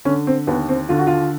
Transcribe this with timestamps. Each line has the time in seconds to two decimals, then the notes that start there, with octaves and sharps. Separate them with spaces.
0.05 D3 C#4
0.27 C4
0.47 D#2 B3
0.69 C4
0.89 D3 F4
0.99 F#4
1.07 F4